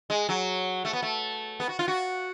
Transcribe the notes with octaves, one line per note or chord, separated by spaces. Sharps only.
G#3
F#3
A3
B3
A3
B3
F#4
F4
F#4